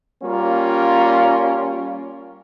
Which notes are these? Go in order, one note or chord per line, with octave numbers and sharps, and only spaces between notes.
G3 A#3 C#4 F4